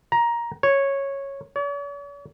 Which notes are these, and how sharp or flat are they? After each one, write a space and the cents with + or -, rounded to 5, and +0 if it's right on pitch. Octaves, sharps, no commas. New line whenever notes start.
A#5 +15
C#5 -10
C#5 +45